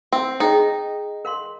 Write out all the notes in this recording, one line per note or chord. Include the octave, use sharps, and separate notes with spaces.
C4
D#4 G#4 D#5 G5
A#4 F5 C6